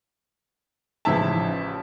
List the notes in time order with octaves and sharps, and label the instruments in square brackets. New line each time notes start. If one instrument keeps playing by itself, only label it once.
[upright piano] A1 C#3 F3 E4 E5 A5